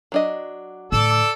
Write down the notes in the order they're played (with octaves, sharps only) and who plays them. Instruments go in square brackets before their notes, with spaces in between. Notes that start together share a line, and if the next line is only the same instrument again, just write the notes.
[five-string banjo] F#3 D4 D#5
[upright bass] A2 D3 [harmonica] A4 D5 E6